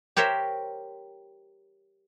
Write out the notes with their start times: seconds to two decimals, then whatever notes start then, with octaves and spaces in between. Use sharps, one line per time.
0.17 G4 A#4 C5 C#5 E5